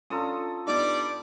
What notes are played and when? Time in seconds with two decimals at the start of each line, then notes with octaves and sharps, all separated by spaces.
0.10 C#4 D4 F4 A4 A#5 D#6
0.67 G2 G3 B3 D#4 D5 D6